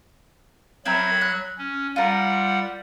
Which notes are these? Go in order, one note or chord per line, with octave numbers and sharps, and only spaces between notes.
F#3 C4 E4 A#4 B5 G#6
F#6
C#4
G3 F4 A#4 F#5